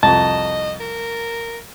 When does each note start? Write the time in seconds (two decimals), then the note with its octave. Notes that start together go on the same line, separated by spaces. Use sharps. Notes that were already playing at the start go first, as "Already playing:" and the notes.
0.03 C2 F2 D#5 A5
0.80 A#4